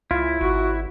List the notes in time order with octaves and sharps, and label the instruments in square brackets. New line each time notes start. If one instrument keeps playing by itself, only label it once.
[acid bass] C#2 [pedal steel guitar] E4 [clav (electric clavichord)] F4
[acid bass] G#1 [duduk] F#4